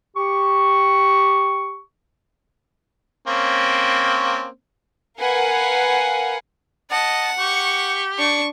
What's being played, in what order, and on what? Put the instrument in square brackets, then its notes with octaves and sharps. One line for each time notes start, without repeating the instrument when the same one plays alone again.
[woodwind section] G4 C#6
[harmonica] A#3 C4 C#4
[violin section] A#4 B4 F5 F#5 G#5
[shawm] D#5 [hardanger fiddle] F#5 [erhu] A5
[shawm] G4 [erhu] C#6
[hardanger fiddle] D4 [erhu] C#6